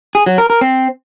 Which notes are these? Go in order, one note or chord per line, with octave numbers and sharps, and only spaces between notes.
G#4
F#3
A#4
A#4
C4